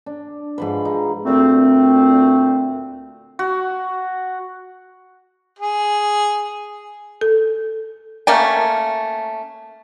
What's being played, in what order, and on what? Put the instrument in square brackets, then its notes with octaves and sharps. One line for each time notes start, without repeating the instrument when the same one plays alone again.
[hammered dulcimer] D4
G#2 F3 B4
F3 D#4
[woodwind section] D2 A#2 A3 C4
[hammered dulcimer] F#4
[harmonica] G#4
[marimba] A4
[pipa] A3 A#3 C#4 G5